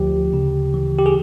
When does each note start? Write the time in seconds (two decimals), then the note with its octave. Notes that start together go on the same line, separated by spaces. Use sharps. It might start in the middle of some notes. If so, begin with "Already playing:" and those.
Already playing: D2 F3 G4
0.34 C#3
0.74 E3
0.98 G4
1.06 G#4